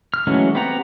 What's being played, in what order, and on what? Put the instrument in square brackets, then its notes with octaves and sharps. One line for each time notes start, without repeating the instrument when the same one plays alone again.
[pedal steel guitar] F6
E3 F#3 G#3 A3 C#4
B3 C4 G4 F#5 A#5